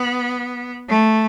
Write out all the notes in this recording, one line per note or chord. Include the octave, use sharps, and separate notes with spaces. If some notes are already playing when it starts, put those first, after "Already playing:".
Already playing: B3
A3